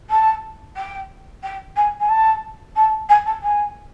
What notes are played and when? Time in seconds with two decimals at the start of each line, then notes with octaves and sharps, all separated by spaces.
0.10 A5
0.76 G5
1.43 G5
1.76 G#5
2.00 G#5
2.09 A5
2.76 A5
3.09 G#5
3.26 A5
3.42 G#5